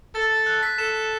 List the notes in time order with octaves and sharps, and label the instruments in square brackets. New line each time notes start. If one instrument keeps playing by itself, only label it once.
[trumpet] A4 [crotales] A6
[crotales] F#6
B6
[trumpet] A4 [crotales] E7